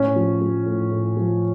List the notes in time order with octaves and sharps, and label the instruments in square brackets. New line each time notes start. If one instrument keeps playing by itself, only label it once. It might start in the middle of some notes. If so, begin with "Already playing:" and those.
Already playing: [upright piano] A2 C#4
F3
F3
A2
A2
F3